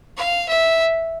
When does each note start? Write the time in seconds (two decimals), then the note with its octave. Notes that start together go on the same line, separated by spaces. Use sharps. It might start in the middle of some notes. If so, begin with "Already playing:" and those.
0.17 F5
0.49 E5